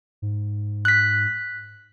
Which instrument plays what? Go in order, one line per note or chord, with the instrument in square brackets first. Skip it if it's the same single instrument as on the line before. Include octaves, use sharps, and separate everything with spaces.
[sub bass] G#2
[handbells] F#6 B6